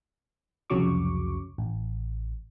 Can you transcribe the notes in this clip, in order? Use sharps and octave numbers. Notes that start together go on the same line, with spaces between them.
C2 F2 C#3 F#3 C#6 D6
A1